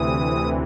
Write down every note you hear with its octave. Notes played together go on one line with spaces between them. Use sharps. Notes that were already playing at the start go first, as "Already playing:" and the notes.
Already playing: D2 C3 E3 D#6